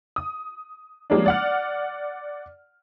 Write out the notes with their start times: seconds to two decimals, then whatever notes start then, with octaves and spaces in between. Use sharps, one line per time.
0.16 D#6
1.10 F3 G3 G#3 A#3 C#4 D4
1.26 D5 F#5 F6